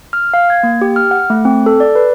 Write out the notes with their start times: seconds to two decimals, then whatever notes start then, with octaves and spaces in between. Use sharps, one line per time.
0.13 F6
0.34 F5
0.50 G#6
0.63 A#3
0.81 G4
0.96 F6
1.11 F#5
1.30 A3
1.45 C4
1.66 A4
1.80 D5
1.95 B4